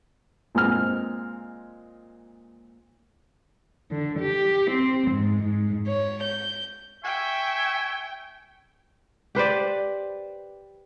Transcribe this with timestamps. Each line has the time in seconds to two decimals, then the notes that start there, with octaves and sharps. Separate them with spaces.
0.55 A#2 G#3 C4 F6
3.90 D3
4.19 G4
4.71 C4
5.11 G#2
5.43 G#2
5.86 C#5
6.22 G6
7.04 E5 G5 G#5 C#6
9.35 G4 B4 C5 D5